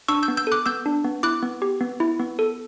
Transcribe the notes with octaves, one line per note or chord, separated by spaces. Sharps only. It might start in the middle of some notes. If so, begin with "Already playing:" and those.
D4 C#6 E6
E6 G6
B3
E6 G6
A4 D6 F#6
B3 E6 G6
D4
B3
E4 D6 F#6
B3
G4
B3
E4
B3
A4